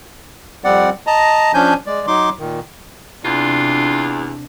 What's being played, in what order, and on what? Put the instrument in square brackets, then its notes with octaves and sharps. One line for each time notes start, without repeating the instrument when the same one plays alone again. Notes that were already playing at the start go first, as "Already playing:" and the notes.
[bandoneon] F2 G3 C4 D5 F#5
D#5 A5 A#5
F3 C#4 D4 G#5 G6
G#3 D5
F#3 D#4 C6 D6
A#2 D#3
[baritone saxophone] E2 [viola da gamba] C3 D4 [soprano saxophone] F4